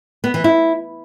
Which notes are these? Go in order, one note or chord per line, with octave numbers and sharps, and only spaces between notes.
B3
E3
E4